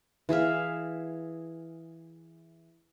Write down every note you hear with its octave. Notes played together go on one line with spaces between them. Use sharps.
E3 G#4 E5 F5